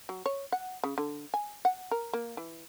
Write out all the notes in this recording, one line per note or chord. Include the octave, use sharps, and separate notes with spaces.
F#3
C#5
F#5
C#3
D3
G#5
F#5
A#4
A#3
E3